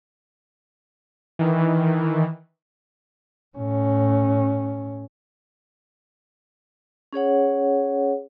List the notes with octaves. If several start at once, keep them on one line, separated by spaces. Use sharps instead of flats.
D#3 E3
A2 C#4
C#4 G#4 C#5 F#5